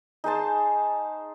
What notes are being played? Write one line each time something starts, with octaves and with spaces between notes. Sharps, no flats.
D#4 G#4 C5 A5